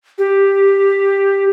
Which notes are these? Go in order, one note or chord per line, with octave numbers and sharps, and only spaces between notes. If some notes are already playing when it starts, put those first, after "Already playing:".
G4